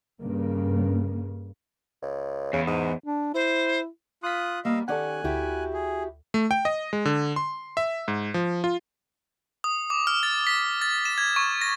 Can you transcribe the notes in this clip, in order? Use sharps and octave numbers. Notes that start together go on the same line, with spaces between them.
G2 C#3 A#3
C#2
E2 C#3
G#2
D4
E4 C5
F4 C6 D#6 F#6 B6
G3 A#3 D#5 F5 E6
D#3 C#4 G4 A4 D5 F#5 G#5 F#6
D2 E4 F#4 G4
G#4
A3
G5
D#5
G#3
D3
C6
E5
G#2
F3
F4
D#6
D6
F6
A6
B6
A6
E7
G#6
C#6
A#6